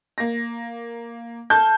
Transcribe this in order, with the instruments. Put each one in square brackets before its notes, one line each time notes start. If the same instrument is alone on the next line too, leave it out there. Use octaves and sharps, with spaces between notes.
[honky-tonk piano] A#3 A#6
[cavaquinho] A4 F5 [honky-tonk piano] G6